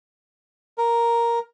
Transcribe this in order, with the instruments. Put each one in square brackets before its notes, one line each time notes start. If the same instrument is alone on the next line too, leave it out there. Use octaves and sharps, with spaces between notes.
[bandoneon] A#4